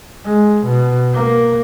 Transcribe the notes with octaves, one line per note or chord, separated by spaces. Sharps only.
G#3
B2
A#3